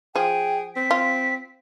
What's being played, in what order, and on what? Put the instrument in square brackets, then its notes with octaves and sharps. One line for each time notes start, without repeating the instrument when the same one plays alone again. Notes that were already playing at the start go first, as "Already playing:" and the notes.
[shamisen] F3 [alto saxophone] G#4 [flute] G5
[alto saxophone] C4 [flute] B6
[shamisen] F4